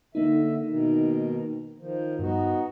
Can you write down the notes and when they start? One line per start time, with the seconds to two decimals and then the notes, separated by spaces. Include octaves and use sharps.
0.15 D3 A#3 D#4 E5
0.66 B2 D#3
1.78 D#3 F3
2.19 G2 B3 D#4 F#4